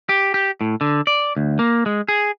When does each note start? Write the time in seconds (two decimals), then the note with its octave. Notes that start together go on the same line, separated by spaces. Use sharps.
0.09 G4
0.34 G4
0.61 A2
0.81 D3
1.07 D5
1.37 D2
1.59 A#3
1.86 G#3
2.08 G#4